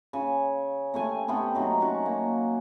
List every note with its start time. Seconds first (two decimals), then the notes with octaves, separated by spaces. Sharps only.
0.13 C#3 G#5
0.94 C3 A3 G#5
1.28 C3 A3 B3 G4
1.55 C3 F#3 D#4
1.80 C#4 F#4
2.06 A#3